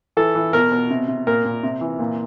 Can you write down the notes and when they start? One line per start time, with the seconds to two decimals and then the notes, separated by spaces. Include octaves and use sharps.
0.17 E3 A4
0.35 E3
0.53 B2 A#4
0.72 B2
0.90 C3
1.08 C3
1.27 A#2 A#4
1.45 A#2
1.63 C3
1.81 E3
1.99 A#2